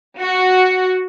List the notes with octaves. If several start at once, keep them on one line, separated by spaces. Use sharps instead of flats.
F#4